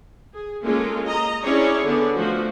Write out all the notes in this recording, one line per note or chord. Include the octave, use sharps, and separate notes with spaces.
G#4
G#3 A#3 C#4 F4 A4
D#5 A#5
C#4 D4 E4 G#4 C#5 D5
D3 B3 G#4 D5
F3 A3 F#4